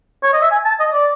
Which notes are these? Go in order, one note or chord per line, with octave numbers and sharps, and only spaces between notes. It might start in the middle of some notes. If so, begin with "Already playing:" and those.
C#5
D#5
E5
G#5
A5
D#5
D5